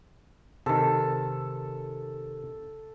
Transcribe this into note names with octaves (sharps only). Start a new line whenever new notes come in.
C3 D#3 A4